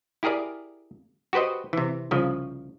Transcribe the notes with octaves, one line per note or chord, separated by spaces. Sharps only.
E4 G4 G#4 A#4 D5
F#4 G4 B4 C5 D#5
C3 E3
C2 C#3 F3